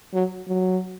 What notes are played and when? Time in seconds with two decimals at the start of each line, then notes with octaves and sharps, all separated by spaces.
0.14 F#3
0.48 F#3